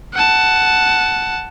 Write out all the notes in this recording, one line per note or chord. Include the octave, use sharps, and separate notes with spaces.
F#5 A5